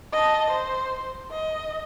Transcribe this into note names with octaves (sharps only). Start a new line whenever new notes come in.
D#5 A5
C5
D#5